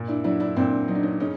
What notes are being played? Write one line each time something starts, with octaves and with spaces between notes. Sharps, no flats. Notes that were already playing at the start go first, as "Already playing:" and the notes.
Already playing: A#2
D4 E4
F#3 D4 E4
D4 E4
A#2 C4 D4
F#3 D#4
D4
C#4 D#4
C#3 C#4 D#4